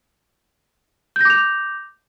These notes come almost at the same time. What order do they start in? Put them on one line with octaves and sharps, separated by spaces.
G6 A#6 D6 F7